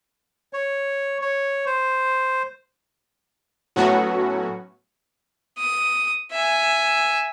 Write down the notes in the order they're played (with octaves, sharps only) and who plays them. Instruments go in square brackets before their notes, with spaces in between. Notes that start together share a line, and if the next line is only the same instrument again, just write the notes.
[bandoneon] C#5
C#5
C5
[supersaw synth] A2 F#3 A3 B3 C#4 F#4
[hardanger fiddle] D#6
E5 G#5